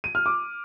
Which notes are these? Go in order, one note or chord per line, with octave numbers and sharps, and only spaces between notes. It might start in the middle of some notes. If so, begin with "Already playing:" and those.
D#7
F6
D6